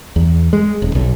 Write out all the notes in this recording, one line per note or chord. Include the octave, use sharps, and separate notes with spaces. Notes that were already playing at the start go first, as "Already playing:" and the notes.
E2
G#3
D#1
B1